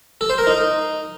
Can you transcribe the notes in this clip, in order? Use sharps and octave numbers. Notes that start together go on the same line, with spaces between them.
A4
C5
A#4
D#4